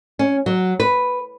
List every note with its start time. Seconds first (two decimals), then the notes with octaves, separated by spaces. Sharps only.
0.19 C#4
0.46 F#3
0.80 B4